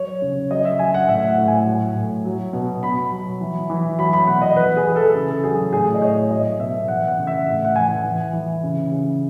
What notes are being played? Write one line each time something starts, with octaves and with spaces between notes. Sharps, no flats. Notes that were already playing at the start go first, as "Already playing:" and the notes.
Already playing: F#3 C#5
C#3
F#3 D#5
E5
F#3 G#5
F#5
A2 E5
F#5
A2
G#5
F#3
A2
F#3
B2
B2 B5
F#3
E3
E3
F#3 B5
B5
B2 F#5
D#5
E3 B4
G#4
E3
A4
C#3 A4
F#3 G#4
A2 G#4
D#5
A2 C#5
F#3 D#5
B2 E5
E3 F#5
F#5
C#3
E5
A2
F#5
E3 G#5
E3
E3
C#3
C#3